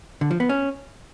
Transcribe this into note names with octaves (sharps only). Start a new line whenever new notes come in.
D3
F3
B3
C#4